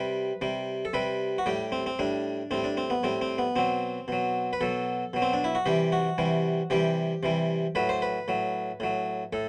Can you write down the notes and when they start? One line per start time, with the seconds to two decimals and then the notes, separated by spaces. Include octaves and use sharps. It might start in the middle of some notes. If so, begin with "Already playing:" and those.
Already playing: C3 G3 B4
0.41 C3 G3
0.85 A4
0.93 C3 G3 B4
1.38 F#4
1.46 A2 G3 G4
1.72 C4
1.86 C4
1.99 A2 G3 D4
2.51 A2 G3 C4
2.64 D4
2.77 C4
2.90 B3
3.03 A2 G3 C4
3.22 C4
3.38 B3
3.56 B2 F#3 C4
4.08 B2 F#3
4.53 B4
4.61 B2 F#3 A4
5.13 B2 F#3
5.22 C4
5.33 D4
5.44 E4
5.55 F#4
5.66 C3 E3 G3 G4
5.92 F#4
6.18 C3 E3 G3
6.70 C3 E3 G3 G4
7.23 C3 E3 G3
7.75 A2 F#3 B4
7.89 C5
8.02 B4
8.28 A2 F#3
8.80 A2 F#3
9.33 A2 A4